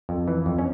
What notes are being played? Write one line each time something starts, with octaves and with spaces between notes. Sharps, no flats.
F2
E3
F2
C#4